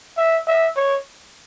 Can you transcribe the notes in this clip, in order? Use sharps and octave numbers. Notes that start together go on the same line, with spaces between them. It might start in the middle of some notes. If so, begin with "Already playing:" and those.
E5
E5
C#5